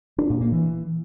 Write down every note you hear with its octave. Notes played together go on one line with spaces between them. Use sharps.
D4
A#2
A#3
E3